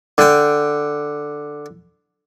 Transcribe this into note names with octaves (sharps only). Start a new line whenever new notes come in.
D3 G5